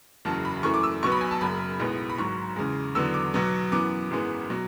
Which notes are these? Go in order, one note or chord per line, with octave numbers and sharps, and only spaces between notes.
F#1 E2 C#3 F#3 A5
B5
F#2 E3 A3 C#6
D6
E6
B1 B2 F#3 B3 C#6
B5
G#5
A5
F#1 F#2 C#3 B5
B1 A2 G#3 B3
B5
G#1 G#2 F#3 C#6
E2 C#3 G#3
E2 D3 F#3 B3 E6
D6
B1 B2 F#3 B3
F#2 E3 B3 D6
G#1 F#2 E3 G#3 B3
B2 F#3